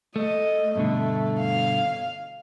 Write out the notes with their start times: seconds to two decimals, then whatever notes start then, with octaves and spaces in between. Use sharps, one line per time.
0.16 A3 D#5
0.76 G2 B2 D3 A3
1.39 F5